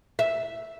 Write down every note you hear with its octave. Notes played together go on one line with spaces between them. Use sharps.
E5